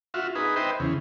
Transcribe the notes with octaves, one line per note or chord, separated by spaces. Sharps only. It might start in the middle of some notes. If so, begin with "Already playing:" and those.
F4 F#4 E5
D#4 G#4 B4
B4 C5 D#5 E5 G5
E2 C#3